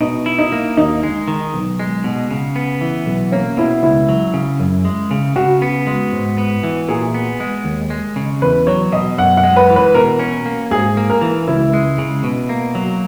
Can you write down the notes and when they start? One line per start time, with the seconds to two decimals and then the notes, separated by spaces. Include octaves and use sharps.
0.01 B2 D#4
0.26 E4
0.38 D#4
0.52 A#3
0.77 D#2 D#4
1.03 G#3
1.28 D#3
1.54 B1
1.80 G#3
2.04 B2
2.31 C#3
2.56 B3
2.81 E3
3.06 B1
3.32 A#3 C#4
3.57 B2 E4
3.83 C#2 E4
4.09 F#3
4.34 C#3
4.60 F#2
4.85 G#3
5.11 C#3
5.36 C#3 F#4
5.62 B3
5.87 G#3
6.12 G#2
6.38 B3
6.63 E3
6.89 A#2 G#4
7.14 B3
7.40 G#3
7.65 D#2
7.90 G#3
8.16 C#3
8.42 E2 B4
8.67 F#3 C#5
8.92 B2 D#5
9.18 F#2 F#5
9.37 F#5
9.44 G#3
9.56 B4
9.70 E3
9.76 B4
9.95 B2 A#4
10.20 C#4
10.46 A#3
10.71 G#2 G#4
10.97 A#3
11.10 A#4
11.21 E3
11.48 C#2 E4
11.73 G#3
11.98 C#3
12.24 B2
12.49 A#3
12.75 F#3